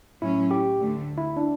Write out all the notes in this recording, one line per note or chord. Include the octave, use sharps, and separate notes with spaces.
A2 F#3 C#4 E4
G4
D2 D3 A3
E4
D4